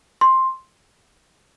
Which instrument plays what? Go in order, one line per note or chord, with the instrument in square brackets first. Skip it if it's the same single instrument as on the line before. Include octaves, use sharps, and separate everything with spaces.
[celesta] C6